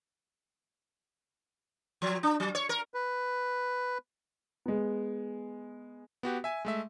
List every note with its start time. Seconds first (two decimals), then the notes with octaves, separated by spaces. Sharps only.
2.02 F3
2.23 D4
2.40 F#3
2.55 C#5
2.69 A#4
2.94 B4
4.66 G#3 B3
6.23 B3 F#4 G4
6.44 E5 G#5
6.65 G#3 A3 E5